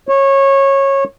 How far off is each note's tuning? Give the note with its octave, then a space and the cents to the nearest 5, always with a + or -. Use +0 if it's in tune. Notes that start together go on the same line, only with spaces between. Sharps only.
C#5 -20